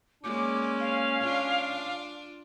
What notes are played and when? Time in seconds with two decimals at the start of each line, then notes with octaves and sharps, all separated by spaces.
0.23 G#3 A#3 C#4 D5 D6
0.79 F5
1.21 D4 F4 D5